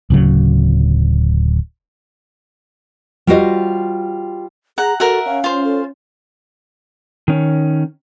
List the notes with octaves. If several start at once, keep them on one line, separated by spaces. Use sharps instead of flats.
D1 C#3 F#3
G3 F4 F#4 C5 D#5
G#4 F#5 A#5
F#4 A4 A#4 E5 F#5
C#4 F5
F4 C5
A4
D#3 C#4